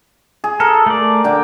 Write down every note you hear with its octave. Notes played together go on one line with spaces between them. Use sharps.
G#4
A4 A#4
A3 D5
D3 G5 D6